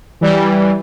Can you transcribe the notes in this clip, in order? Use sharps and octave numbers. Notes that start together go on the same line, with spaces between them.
E3 G3